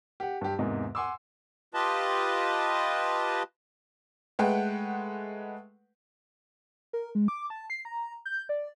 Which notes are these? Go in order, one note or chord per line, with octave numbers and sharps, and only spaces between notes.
G4 F#5
G2 G4
E2 G#2 C3 A#3 D#5
F#5 G#5 C6 D6 E6
F4 G4 B4 D#5 A5
G#3 A3 B4 F#5 G5
A#4
G#3
D6
A5
C7
A#5
G6
D5